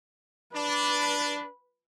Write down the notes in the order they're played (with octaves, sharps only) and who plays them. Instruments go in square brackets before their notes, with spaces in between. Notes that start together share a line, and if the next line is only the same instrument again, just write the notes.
[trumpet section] D4 [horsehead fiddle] B4